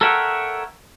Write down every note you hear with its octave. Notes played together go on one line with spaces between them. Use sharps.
A4 A#4 C#5 E5 F#5 G5